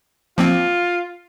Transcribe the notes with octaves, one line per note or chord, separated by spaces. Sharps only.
F3 A#3 C4 F4